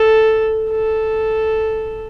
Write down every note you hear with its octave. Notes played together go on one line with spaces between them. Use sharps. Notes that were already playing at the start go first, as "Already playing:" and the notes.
Already playing: A4
A4